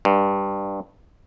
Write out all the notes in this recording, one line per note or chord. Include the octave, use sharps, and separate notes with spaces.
G2